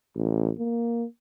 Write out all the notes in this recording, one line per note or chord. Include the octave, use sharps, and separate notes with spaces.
A1
A#3